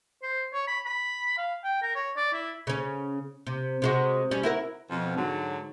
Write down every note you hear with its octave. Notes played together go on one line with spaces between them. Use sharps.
C5
C#5
B5
B5
F5
G5
A#4
C#5
D5
E4
C#3 C#4
C3
C3 G#3 F#4
G3 C#4
E4 F#4 A#4
F2 B2
G#2 D3 F#3